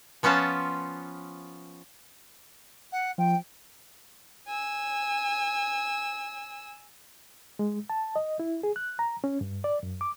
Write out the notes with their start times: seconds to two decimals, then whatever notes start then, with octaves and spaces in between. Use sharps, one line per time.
0.23 F3 B3 C#4 F4 A5
2.92 F#5
3.18 F3 G5
4.47 G#5 E6
7.59 G#3
7.90 A5
8.16 D#5
8.40 E4
8.63 G#4
8.76 F#6
8.99 A#5
9.24 C#4
9.41 G2
9.64 D5
9.83 F#2
10.01 D6